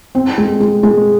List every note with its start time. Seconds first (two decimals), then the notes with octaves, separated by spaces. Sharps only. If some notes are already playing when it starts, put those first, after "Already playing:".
0.15 C4
0.38 G#3
0.60 G#3
0.83 G#3